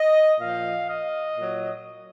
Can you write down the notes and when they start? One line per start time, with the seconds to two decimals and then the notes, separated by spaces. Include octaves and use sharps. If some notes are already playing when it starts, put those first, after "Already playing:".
Already playing: D#5
0.40 A#2 F3 F5
0.89 D#5
1.37 A#2 F#3